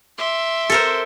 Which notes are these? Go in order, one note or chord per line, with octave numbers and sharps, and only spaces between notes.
E5 C6 D6
A4 A#4 C5